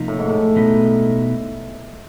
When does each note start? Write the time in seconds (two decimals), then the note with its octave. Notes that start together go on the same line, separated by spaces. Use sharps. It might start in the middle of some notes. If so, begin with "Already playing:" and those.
Already playing: C3 F3 A#3 D#4
0.08 A2
0.19 G#2
0.29 A2
0.56 B2 G3 B3 D#4